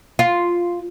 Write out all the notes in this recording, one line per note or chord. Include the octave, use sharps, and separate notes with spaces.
F4